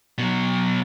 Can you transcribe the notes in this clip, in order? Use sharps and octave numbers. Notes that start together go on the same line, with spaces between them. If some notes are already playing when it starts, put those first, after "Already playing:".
B2 F#3